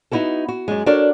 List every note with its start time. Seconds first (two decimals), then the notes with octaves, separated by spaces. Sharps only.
0.11 B3 D#4 E4 F#4 A4
0.48 F#4
0.68 F#2 G#3
0.86 D4 F#4 A4 A#4 C#5 D5